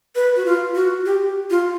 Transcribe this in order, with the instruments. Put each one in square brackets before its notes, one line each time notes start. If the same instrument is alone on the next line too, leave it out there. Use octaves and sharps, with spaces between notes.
[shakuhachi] B4
F#4
F4
F#4
G4
F4